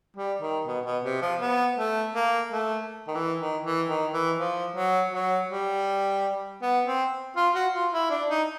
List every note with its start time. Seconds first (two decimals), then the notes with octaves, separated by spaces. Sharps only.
0.17 G3
0.42 D#3
0.67 B2
0.85 B2
1.04 C3
1.22 F3
1.41 B3
1.78 A3
2.15 A#3
2.52 A3
3.08 D#3
3.15 E3
3.40 D#3
3.64 E3
3.89 D#3
4.13 E3
4.39 F3
4.76 F#3
5.13 F#3
5.51 G3
6.62 B3
6.87 C4
7.36 F4
7.55 F#4
7.74 F4
7.93 E4
8.11 D4
8.30 D#4